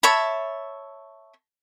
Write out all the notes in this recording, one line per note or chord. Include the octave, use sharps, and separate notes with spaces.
C#5 E5 A5 B5